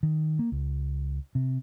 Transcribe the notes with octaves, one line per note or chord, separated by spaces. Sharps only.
D#3
A#3
C#2
C3